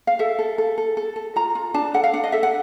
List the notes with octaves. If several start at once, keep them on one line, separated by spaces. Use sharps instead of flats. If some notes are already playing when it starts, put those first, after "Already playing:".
F5
A4 E5
A4
A4
A4
A4
A4
F4 A#5
F4
D4 A5
A4 F#5
F5
D4 F#5
D#5
A4 E5
F#5